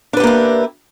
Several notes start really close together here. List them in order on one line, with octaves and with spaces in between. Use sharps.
D4 B4 G4 A#3 E4